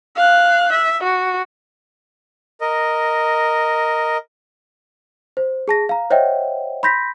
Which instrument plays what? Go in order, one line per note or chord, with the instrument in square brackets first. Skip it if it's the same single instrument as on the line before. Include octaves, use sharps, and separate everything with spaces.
[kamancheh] F5 F#6
E5
F#4
[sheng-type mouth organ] A#4 D#5
[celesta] C5
G#4 A5 A#6
F5 A#5
C5 C#5 D#5 E5 F#5 G5
B5 C6 G6 A#6 B6